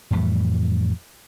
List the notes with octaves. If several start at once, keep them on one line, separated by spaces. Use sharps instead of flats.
F2 A2 E3 G3